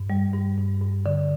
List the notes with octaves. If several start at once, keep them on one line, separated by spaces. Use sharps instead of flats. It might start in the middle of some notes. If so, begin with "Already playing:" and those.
Already playing: G2
G3
G2
G2
G2
D3